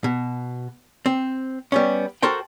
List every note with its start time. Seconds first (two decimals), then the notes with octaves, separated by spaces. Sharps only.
0.04 B2
1.06 C4
1.72 G3 B3 C#4
2.23 F#4 A4 A#4 C5 G5